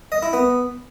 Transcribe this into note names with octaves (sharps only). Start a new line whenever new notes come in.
D#5
E4
B3